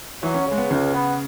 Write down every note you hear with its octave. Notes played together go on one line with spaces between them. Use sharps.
E3 F#3
C#4
C#3
G#3
B3
C#2 C#3
B3